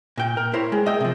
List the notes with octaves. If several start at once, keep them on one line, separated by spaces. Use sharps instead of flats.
A#2 G5
A#4
E4 A#4 C5 C#5
G#3
D#5 E5 G5
C3 F3